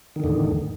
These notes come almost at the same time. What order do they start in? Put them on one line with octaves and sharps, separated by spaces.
D#3 D3 E2 A2